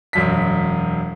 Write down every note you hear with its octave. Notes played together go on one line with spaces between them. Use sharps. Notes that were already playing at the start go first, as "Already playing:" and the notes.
E1 F#2 B6